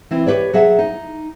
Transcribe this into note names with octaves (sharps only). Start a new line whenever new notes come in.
E3 C4 E4
G4 B4 C#5 D5
F#3 G#4 E5 F#5
D#4